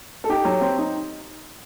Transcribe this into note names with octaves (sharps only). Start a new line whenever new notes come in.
A4
D#4 G4
F#3
C4
D#4